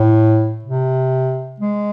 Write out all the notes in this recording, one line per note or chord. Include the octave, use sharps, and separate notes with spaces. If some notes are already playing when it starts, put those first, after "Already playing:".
Already playing: A2
C3
G#3